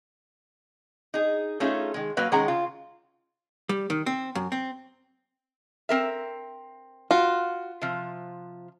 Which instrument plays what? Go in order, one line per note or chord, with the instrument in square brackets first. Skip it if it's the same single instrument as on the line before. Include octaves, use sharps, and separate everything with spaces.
[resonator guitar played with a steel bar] D#4 G#4
A3 C#4 D#4 F4 G#4
D#3 G#3
F#3 A#3 B4 F5
D#3 G#3 C#4 G#4 F#5 A#5
C#3 F4
[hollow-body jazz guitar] G3
D#3
C4
F#2
C4
[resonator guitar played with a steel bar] C4 A#4 E5
[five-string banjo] F4 [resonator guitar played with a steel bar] F#4
[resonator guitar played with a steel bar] C3 F3